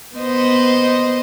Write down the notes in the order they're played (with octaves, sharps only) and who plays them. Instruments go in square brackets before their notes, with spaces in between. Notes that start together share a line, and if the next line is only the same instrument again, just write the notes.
[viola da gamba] B3 C5 D#5